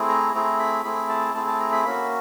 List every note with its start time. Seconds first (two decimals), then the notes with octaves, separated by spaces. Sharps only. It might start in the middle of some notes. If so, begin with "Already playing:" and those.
Already playing: A3 C4 E4 G#4
0.09 A#5
0.34 A3 C4 E4 G#4 A#5
0.59 B5
0.84 A3 C4 E4 G#4 B5
1.09 A5
1.34 A3 C4 E4 G#4 A5
1.47 A5
1.60 A#5
1.72 B5
1.84 A#3 C#4 F#4 B5